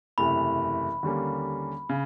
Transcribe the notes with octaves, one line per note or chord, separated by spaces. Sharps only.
F#1 E2 C3 E3 A3 B5
D#2 D3 G3 A#3 C#4
C#3